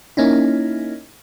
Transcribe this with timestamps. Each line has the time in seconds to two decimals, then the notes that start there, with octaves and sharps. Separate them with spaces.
0.17 A#3 C#4 D#4 E4